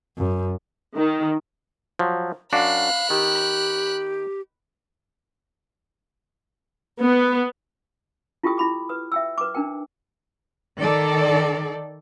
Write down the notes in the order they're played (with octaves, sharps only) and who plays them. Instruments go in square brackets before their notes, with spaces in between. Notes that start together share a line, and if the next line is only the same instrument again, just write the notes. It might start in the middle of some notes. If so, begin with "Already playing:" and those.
[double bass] F#2
[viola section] D#3
[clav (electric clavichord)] F3 F#3
[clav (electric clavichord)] F#2 D4 F#4 [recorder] F5 [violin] B5 F#6
[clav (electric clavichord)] D#3 [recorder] G4
[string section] B3
[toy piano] E4 F4 G4 A4 G5 D#6
E4 B5 D6
B4 D#6
E5 G5 E6
B4 D6
D4 D#4 A#4 G5
[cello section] D#3 A4 D5